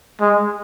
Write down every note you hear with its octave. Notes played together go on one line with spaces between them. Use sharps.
G#3